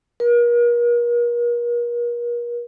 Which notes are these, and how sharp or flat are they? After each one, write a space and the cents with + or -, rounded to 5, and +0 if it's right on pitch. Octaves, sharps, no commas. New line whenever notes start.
A#4 +40